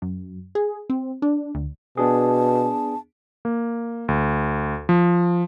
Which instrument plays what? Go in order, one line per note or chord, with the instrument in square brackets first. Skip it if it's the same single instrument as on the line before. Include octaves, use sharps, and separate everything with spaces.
[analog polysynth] F#2
G#4
C4
D4
D2
[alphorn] B2 [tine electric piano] B3 D4 G#4 [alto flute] A5
[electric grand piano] A#3
D2
F3